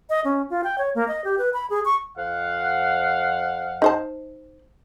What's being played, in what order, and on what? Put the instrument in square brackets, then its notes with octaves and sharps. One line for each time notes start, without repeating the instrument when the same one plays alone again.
[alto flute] D#5
C#4
F4
G5
C#5
A#3
D#5
G4
B4
B5
G#4
C#6
[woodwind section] F2 F5 F#5
[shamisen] D#4 C5 A5